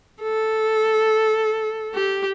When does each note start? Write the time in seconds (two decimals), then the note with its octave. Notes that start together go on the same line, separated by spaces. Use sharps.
0.22 A4
1.95 G4